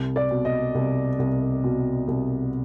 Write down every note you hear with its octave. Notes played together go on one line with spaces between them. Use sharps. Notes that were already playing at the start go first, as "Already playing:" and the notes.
Already playing: C2
D5
B2
D#5
C2
C2
B2
C2